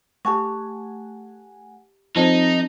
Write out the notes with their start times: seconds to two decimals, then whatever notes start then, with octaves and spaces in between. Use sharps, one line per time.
0.25 A3 G4 F#5 G#5 A5 C#6
2.16 F3 C4 D#4 A4 A5